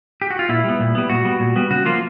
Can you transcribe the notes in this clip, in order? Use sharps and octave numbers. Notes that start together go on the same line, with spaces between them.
G4
F#4
F4
A#2 E4
G3 B3
A#2
G3 B3
A#2 F#4
G3 B3
A#2
G3 B3
C#3 F#4
F3 A#3 F4